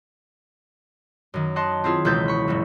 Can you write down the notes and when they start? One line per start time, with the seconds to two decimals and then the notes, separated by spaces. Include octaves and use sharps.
1.34 F#2 D#3
1.56 D#5 F#5 A5 C6
1.84 C4 E4 F4 G#4
2.05 E1 C#2 E4 B4 G6 A6
2.28 B5 C#6
2.48 F#1 G#2 E3